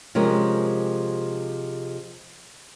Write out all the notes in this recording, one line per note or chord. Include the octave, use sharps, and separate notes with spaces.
C3 F3 G#3 C#4 A#4